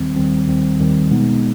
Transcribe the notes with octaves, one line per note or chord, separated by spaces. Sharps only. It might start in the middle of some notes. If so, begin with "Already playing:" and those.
Already playing: D#2 D#3 G3 C4
D#2 D#3 G3 C4
D#2 D#3 G3 C4
D#2 D#3 G3 C4
B2 G#3 B3 D#4